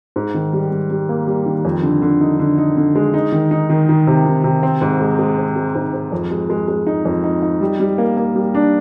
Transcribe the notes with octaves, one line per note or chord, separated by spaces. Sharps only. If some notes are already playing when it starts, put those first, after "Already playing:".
G#2
D#3
G3
G3
G3
A#3
G3
D#3
F2
D3
D3
D#4
D3
D#4
D3
G#3
D#4
D#3
D#4
D#3
D#3
C3
D#3
C3
C4
G#2
G#3
G#3
C4
G#3
G#2
G#2
F2
G#3
G#3
G#3
D#4
F2
D#4
D#4
G3
G3
A#3
A#3
G3
D4